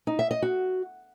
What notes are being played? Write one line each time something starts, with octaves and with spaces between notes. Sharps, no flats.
D#4
E5
D#5
F#4